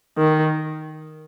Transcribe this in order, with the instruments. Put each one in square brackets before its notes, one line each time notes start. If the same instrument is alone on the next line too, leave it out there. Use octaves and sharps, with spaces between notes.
[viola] D#3